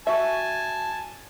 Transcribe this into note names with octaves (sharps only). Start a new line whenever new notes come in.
F#4 E5 G#5 A5